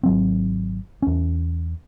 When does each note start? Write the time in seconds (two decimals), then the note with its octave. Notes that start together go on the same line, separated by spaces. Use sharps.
0.03 G#1 F#3 C4
1.02 E2 C#4